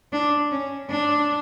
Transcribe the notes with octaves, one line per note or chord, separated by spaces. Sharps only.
D4
C#4
D4